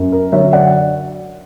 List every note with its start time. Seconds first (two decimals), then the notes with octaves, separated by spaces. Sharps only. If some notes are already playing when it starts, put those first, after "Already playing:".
Already playing: F#2
0.12 A#4
0.32 D3 F#3 C#5 E5
0.53 D5 F#5